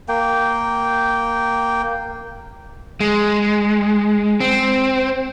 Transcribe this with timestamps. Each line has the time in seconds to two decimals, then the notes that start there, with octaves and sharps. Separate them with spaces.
0.08 A#3 G5
3.00 G#3
4.40 C4